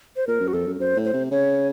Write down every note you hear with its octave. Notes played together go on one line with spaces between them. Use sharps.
C5
A#2 A#4
F#2
F#4
F2 A4
F#2
F#2 C5
A2
C5
C3
C#3 C#5